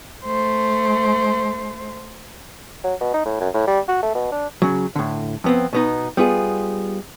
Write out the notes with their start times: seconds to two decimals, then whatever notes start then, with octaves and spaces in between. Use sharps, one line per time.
0.25 A3 C5
2.84 F#3
3.01 B2
3.14 D#4
3.26 A2
3.41 F#2
3.54 A2
3.67 G3
3.88 F#4
4.03 A3
4.15 B2
4.32 D4
4.62 C#3 F#3
4.96 A2 D3
5.44 F2 B3 C4
5.73 B2 B3 D#4
6.17 G3 B3 F4 G#4